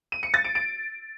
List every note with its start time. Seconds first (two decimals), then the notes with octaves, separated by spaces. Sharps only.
0.12 D#7
0.23 C#7
0.34 A6
0.44 D7
0.55 D7